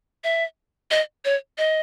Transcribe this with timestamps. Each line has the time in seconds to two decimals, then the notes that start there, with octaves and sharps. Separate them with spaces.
0.24 E5
0.91 D#5
1.25 C#5
1.58 D#5